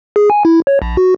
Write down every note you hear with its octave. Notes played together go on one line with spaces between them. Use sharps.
G#4
G#5
E4
C#5
A#1
F#4